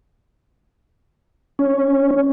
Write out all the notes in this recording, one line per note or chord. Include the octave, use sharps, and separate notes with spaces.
C#4